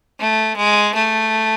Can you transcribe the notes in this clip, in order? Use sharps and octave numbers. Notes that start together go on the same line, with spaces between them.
A3
G#3
A3